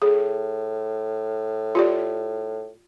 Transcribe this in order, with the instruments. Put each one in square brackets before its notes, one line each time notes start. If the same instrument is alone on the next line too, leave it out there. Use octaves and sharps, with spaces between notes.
[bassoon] A2 [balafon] G#4
[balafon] F4 G4 D5